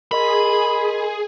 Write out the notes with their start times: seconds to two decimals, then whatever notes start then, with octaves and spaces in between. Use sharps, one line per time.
0.11 G#4 A#4 D#5 B5 C6